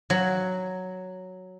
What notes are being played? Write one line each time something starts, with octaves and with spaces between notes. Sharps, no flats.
F#3